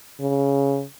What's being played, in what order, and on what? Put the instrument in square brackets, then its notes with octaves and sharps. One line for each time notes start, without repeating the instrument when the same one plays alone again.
[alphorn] C#3